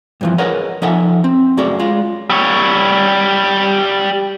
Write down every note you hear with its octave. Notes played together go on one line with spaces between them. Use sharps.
G2 E3 F3
G#4 A#4 B4 C#5 D#5 F#5
F3 D#4 A4 E5 F#5 G#5
C4
F#2 A3 F#4 G#4 D5
G#3 F4
G3 C#5